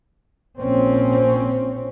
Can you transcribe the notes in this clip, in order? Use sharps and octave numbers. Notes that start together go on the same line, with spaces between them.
A#1 C4 C#4